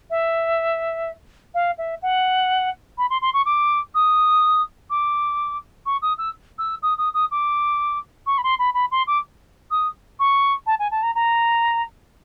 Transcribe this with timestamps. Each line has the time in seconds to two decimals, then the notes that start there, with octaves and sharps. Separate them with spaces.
0.10 E5
1.54 F5
1.78 E5
2.02 F#5
2.98 B5
3.10 C6
3.21 C6
3.33 C#6
3.45 D6
3.94 D#6
4.90 D6
5.86 C#6
6.02 D#6
6.18 E6
6.58 E6
6.82 D#6
6.98 D#6
7.14 D#6
7.31 D6
8.26 C#6
8.38 B5
8.43 C6
8.59 B5
8.74 B5
8.91 C6
9.07 D6
9.71 D#6
10.19 C#6
10.66 A5
10.79 G#5
10.91 A5
11.03 A#5
11.15 A#5